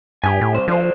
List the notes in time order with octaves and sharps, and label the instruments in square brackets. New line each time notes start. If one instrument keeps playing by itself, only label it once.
[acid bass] G2 [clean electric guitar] G4 G#5
[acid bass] A2
[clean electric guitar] C2 C5
[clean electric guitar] D3 C5 [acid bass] F3